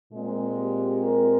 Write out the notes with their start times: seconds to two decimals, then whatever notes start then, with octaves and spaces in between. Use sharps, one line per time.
0.12 A#2 G#3 C4
0.56 G4
1.01 A#4